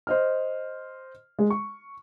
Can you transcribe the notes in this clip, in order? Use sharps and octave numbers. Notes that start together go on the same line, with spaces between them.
C5 D#5 F6
G#3
C#6